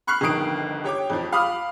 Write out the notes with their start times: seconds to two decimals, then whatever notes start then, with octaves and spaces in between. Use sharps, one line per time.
0.07 B5 C#6 F6 F#6 C7
0.21 G1 F2 D#3 D#6 C7 D7
0.84 G4 C#5 G5 D6
1.10 F2 F3
1.32 F5 B5 D6 D#6 F6